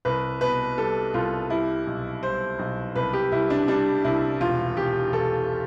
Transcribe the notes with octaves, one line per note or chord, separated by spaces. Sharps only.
C2 B4
B2 B4
G3 A4
C2 F4
G3 E4
B1
G3 C5
B1
C2 B4
G4
C2 E4
D4
G3 D4
C2 E4
E1 F4
E1 G4
E1 A4